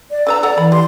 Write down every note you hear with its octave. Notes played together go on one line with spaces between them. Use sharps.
D5
D3 B4 A#5 E6
A4 D5 F#5 A#5
E3 B5
G4 C6